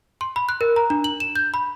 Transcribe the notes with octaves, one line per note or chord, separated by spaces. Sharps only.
C6
B5
F#6
A#4
A#5
D4
F#7
E7
G6
B5